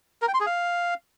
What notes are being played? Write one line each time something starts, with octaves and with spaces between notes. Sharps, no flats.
A#4
G5
C6
G#4
F5